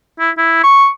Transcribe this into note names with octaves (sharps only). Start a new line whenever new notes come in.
E4
E4
C#6